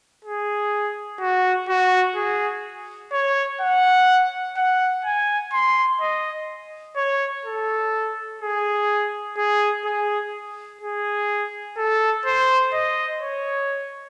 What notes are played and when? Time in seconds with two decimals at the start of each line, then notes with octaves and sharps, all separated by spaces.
0.25 G#4
1.20 F#4
1.69 F#4
2.16 G#4
3.12 C#5
3.61 F#5
4.56 F#5
5.05 G#5
5.53 C6
6.01 D#5
6.96 C#5
7.45 A4
8.42 G#4
9.37 G#4
9.85 G#4
10.82 G#4
11.77 A4
12.25 C5
12.73 D#5
13.22 C#5